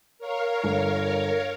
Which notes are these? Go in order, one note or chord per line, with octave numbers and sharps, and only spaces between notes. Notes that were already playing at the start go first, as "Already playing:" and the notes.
A#4 C#5 F5
G1